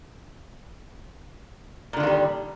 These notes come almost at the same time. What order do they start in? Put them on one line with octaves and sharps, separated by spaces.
A#2 D3 D#3 A#3 G3